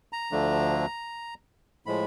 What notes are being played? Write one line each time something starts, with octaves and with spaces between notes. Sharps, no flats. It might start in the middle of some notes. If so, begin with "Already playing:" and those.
A#5
D2 D3 F3 A3 D4
A2 F3 G#3 B5